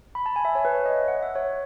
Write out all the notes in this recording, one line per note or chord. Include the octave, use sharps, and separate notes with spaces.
B5
A5
G#5
E5
C#5
B4
C#5
D#5
F#5
E5
C#5